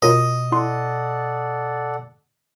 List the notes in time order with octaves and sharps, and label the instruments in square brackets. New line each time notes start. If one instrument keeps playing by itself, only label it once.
[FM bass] B2 [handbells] F4 A#4 C#5 [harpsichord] D#5
[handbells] E4 C6 [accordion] A4 D5 F#5